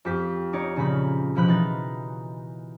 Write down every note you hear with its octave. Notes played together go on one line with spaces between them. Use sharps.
F2 G4 B6
D#4 C#5 D5
A#2 C#3 F3 D#4 B5
B2 F3 B5 F#6
E3 D#4 A6